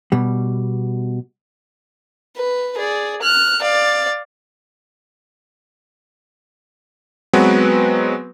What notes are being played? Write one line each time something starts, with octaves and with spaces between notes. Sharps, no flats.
B2 G3
B4
G#4 D5
F6 F#6
D5 F5
F#3 G#3 B3 C4 F#4 B4